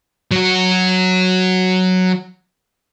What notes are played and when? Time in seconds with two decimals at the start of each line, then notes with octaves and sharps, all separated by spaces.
0.31 F#3 F#4